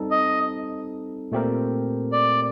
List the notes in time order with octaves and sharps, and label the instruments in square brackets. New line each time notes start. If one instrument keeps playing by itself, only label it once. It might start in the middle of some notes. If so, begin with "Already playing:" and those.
Already playing: [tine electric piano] G3 C4 D#4 A4
[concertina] D#5
[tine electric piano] A#2 A3 C4 G4 A#4
[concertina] D5